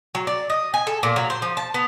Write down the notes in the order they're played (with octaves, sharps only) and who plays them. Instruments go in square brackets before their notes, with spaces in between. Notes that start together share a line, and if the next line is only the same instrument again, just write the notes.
[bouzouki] F#3
D5
D#5
G#5
A4
A#2
F#3
C5
F3
A5
B3